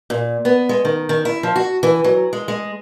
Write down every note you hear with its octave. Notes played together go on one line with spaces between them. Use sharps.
A#2
B3
G#3
D#3
D#3
E4
F3
F#4
E3
F#3
G#3
G#3